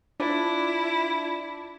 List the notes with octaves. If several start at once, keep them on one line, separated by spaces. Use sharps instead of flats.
D4 E4 F4